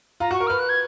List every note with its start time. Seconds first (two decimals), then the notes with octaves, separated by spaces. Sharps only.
0.20 F4 A#5
0.31 F#4 C#6
0.40 A#4
0.47 B4 F6
0.59 F#6
0.69 G#6